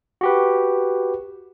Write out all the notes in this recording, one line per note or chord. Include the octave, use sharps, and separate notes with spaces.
F#4 G4 B4